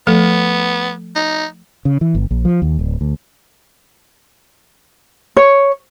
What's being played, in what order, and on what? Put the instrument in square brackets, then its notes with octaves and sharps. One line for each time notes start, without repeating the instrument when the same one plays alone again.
[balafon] F3 A3 A4 [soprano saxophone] B3
[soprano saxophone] D#4
[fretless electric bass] C#3
E3
G1
A#1
F3
D#2
D1
D2
[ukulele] C#5